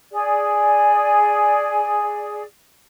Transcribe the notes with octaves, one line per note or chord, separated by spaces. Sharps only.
G#4 D5